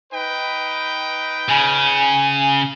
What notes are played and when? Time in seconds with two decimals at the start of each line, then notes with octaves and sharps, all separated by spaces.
0.12 D#4 B4 G5
1.49 C#3 G#5